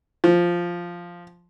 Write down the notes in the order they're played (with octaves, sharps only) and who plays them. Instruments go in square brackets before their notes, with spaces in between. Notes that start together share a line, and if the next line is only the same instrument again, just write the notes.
[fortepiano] F3